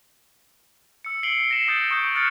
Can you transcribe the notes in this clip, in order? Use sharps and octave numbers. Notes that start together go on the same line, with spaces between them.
E6 C#7
C7 D7 F#7 G7
A#6 E7
D#6 G6 A6
C#6 D#6 G6 D7
F6 F#6 A6 C#7 E7